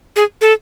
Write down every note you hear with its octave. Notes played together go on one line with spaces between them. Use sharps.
G#4
A4